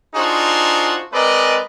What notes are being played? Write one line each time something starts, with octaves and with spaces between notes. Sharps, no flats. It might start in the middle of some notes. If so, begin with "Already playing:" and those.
D4 D#4 F4 F#4 G#4 C5
G#3 C4 A#4 B4 D5 D#5